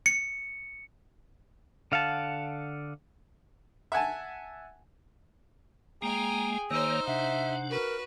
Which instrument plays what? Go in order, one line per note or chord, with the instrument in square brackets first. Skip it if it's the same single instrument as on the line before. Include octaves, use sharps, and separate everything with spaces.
[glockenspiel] C#7
[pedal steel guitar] D3 F5 F#5 A5
[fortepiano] E5 F#5 G#5 A5
[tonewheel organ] G#3 A#3 [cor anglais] G#4 [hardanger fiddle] G5 G#5 [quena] A#5
[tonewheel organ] D#3 A#3 C#5 [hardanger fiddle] D#4 C5 [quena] E6
[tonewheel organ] C3 D4 [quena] E5 [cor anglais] F#5
[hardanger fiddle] F#4 B4 [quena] A#4